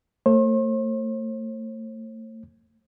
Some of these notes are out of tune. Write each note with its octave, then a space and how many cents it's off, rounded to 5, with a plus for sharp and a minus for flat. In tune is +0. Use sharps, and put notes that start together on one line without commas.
A3 +35 C5 +45